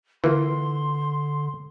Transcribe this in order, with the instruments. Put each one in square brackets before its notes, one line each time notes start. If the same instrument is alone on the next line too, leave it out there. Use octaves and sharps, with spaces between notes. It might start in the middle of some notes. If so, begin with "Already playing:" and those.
[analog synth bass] D3 [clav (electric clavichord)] E3 A#3 F4 [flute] C6